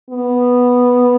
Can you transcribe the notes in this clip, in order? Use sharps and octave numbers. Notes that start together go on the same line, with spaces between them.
B3